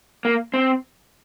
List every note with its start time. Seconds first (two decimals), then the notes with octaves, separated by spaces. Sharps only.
0.25 A#3
0.54 C4